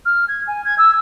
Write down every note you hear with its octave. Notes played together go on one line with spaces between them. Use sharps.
F6
G#6
G#5
G#6
E6